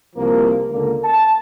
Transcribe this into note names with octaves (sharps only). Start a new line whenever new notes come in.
C2 F3 A#3
C#2 D3 A#3
A5